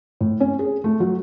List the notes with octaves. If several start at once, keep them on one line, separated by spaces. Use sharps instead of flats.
A2
C#4
G#4
A3
F#3